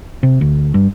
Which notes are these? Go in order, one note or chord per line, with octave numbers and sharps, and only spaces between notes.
C3
D2
G2